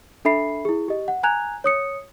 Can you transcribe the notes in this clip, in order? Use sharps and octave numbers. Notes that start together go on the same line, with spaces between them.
D4 A4 E5 B5 C7
E4 G#4
G4 D#5
F#5
G#5 A#5 F#6 G#6 F7
C#5 D#6 C#7